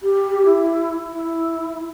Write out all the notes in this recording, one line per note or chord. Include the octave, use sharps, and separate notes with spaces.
G4
E4
E4